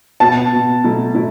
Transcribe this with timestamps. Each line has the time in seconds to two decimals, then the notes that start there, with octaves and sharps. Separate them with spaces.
0.20 B2 B3 F#4 A5
0.52 B2 B3 F#4
0.84 B2 F#3 A3 E4
1.15 B2 F#3 A3 E4